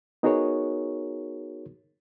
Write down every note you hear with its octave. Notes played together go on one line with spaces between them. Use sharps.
B3 D#4 F#4 G#4 A#4 C#5